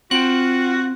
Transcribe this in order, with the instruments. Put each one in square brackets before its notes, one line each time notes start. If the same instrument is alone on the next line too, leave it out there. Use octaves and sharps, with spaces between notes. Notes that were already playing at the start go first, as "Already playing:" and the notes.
[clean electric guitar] C4 G5 [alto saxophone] F4 [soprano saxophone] F#4 [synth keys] F#6